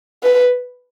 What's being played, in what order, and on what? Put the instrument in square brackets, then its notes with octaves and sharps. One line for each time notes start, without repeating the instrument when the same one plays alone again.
[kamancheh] B4